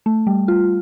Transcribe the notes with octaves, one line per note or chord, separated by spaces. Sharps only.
A3
G3
F4